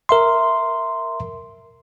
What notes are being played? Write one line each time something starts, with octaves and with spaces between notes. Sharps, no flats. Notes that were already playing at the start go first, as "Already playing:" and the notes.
A#4 E5 C6